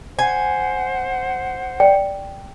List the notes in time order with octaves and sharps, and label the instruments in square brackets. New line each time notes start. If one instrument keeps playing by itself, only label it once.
[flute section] C5 F#5 [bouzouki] G#5
[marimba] D5 [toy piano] G5